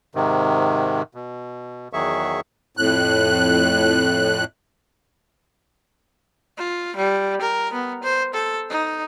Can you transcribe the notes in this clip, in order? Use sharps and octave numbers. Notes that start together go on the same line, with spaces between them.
G#2 C3 D#3
B2
E2 D#3 F#3 G#4 E5 C#6
F2 A2 F#6
F4
G3
A#4
B3
C5
A4
D#4